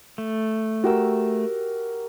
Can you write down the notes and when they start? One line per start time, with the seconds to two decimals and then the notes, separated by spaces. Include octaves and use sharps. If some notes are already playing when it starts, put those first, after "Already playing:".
0.18 A3
0.84 F#4 G4 A#4 E6